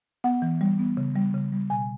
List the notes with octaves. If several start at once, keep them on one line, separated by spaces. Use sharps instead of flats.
B3 F#5
E3
G3
B3
C#3
G3
C#3
G3
B2 G#5